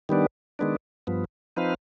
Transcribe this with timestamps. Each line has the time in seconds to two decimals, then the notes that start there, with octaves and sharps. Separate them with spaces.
0.09 D#3 G3 B3 D4
0.59 D#3 G#3 B3 D4
1.07 G2 F3 B3
1.57 F3 C4 D#4 B4 F5